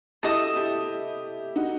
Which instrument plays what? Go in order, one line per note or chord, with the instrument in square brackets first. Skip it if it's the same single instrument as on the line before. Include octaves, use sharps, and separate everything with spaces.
[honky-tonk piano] E4 G4 [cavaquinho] A4 D#5 A5 D#6
[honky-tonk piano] E4 G4
D#4 F#4